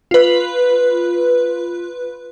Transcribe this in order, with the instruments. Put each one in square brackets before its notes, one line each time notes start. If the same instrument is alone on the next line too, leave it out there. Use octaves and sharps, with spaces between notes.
[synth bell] F4 B4